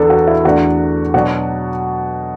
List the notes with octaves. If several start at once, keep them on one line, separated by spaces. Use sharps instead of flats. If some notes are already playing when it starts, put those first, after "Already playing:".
Already playing: E2 D3 B3 D4 A4
F#4
E4
E2 D3 A3 D4 F#4
B2 F#3 D4 F#4